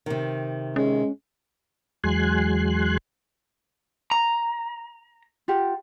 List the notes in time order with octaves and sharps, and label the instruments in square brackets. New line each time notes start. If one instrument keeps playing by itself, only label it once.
[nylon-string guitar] C3 D#3
[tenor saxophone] G#3 [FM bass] C#4
[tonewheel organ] E2 F#3 G#3 G#5 C6 F#6
[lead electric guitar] A#5
[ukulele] F4 G4 F#5